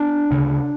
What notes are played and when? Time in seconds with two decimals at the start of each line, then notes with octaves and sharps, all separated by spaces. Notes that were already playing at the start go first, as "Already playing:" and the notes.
Already playing: B3 D4
0.31 D2 C#3